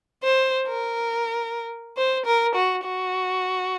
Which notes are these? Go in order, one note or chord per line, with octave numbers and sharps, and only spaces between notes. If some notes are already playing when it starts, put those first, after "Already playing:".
C5
A#4
C5
A#4
F#4
F#4